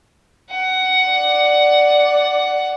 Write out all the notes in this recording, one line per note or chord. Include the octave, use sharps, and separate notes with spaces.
F#5
D5